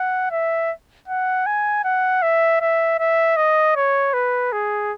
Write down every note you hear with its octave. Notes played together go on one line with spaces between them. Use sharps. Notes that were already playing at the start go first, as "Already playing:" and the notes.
Already playing: F#5
E5
F#5
G#5
F#5
E5
E5
E5
D#5
C#5
B4
G#4